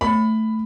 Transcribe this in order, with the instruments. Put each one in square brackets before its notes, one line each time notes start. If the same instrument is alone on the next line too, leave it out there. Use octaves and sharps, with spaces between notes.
[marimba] A3 [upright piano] B5